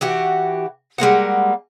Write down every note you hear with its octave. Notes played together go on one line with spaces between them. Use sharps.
E3 F#4 G4
G3 G#3 A#3 F#5